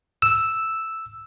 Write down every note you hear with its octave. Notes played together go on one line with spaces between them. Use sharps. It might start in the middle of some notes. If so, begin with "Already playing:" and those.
E6